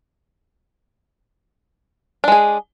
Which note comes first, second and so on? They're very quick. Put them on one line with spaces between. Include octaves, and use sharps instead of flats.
D4 G#3 G#4